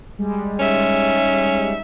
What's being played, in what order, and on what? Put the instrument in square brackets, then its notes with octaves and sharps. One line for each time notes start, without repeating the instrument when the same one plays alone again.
[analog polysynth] G3 G#3
[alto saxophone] C#4 [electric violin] D#4 E5